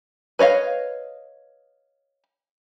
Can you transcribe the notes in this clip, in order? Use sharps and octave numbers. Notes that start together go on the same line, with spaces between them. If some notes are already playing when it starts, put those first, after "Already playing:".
B4 C#5 D#5 F5